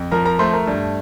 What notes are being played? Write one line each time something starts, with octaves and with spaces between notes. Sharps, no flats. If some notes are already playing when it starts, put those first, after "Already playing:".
Already playing: F2
F3 A#4 A#5
A#4 A#5
A3 C5 C6
A#4 A#5
G2